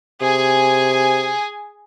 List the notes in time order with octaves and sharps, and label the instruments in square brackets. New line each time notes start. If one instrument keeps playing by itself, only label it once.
[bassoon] C3 [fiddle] G#4 G#5